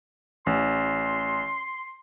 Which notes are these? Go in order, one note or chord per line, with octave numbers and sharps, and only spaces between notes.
A1 C6